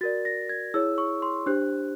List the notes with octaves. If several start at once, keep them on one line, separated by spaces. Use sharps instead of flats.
F#4 A#4 D5 A6
A#6
G#6
E4 G#4 C#5 E6
C#6
C6
D4 G4 C5 F#6